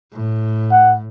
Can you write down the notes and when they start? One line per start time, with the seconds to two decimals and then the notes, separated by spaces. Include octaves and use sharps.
0.13 A2
0.71 F#5